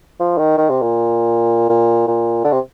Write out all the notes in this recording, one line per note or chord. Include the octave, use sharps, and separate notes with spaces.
F3
D#3
D#3
C3
A#2
A#2
A#2
D3
C3